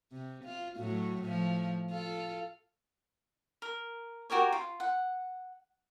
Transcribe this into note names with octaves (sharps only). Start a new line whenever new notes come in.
C3
F4
A2 F#3
A2 F3
F4 A4
A#4
F#4 G4 A#4 C#5
F4
F#5